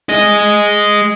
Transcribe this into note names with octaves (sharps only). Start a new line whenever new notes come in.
G#4 D#5